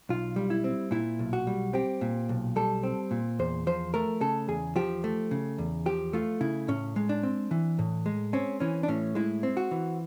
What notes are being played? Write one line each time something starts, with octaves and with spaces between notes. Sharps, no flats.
B1 F4
G3
E4
C4
A#2 E4
B1
F#4
G3
C4 G4
A#2
B1
G3 A4
C4
A#2
E2 C5
F3 C5
A3 A#4
C#3 A4
E2 G#4
F3 G4
A3
C#3
E2
F3 G4
A3 F4
C#3 E4
A2 C#4
G#3
D4
C4
E3
A2
G#3
C4 C#4
E3 C#4
D4
A2 C#4
G#3 E4
C4
F#4
E3